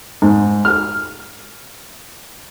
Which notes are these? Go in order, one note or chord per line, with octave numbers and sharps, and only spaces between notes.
G#2
F6